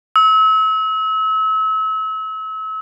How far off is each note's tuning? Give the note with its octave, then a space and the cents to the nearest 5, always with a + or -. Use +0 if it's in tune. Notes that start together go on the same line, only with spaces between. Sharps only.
E6 -35